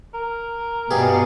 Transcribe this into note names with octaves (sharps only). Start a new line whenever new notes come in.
A#4
G2 B2 G3 G#4